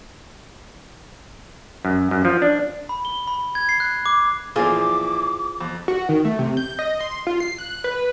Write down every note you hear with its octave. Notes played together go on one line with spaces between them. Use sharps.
F#2
F#2
F3
D4
B5
G7
B5
G#6
C7
F#6
D6
A#2 E3 F3 C4 F4 G#4 D6
F2
F#4
D#3
A3
C3
G6
D#5
C6
F4
C7
F#6
B4